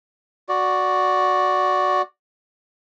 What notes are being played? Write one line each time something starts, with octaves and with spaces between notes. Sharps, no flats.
F#4 D5